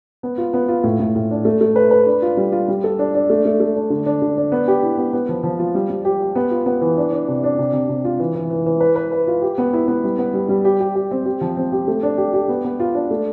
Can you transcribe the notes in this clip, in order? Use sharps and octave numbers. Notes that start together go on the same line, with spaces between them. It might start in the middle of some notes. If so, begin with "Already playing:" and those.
B3
F4
B3
F4
A2
A2
A2
D4
A3
A3
B4
B4
D4
F4
G3
F4
G3
A4
D4
D4
A3
A3
A3
D4
D3
D4
D3
D4
B3
G4
E4
B3
B3
F3
F3
F4
G3
G3
G4
G4
B3
F4
B3
E3
D4
D4
C3
D4
C3
C3
C3
F4
E3
E3
E3
E3
B4
B4
B4
F4
G4
B3
E4
B3
G3
B3
G3
G3
G4
G4
G4
C4
G4
F3
C4
G4
A3
D4
G4
G4
B3
B3
F4
D4
A3